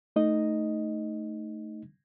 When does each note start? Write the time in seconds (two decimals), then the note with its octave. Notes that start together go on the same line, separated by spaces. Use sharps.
0.16 A3 D#4 D#5